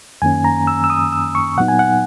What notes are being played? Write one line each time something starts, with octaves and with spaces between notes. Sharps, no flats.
F#2 D#3 A#3 C#4 G#5
A#5
E6
E6
D#6
E6
C#6
A#2 F#3 B3 D#4 F#5
G#5
F#5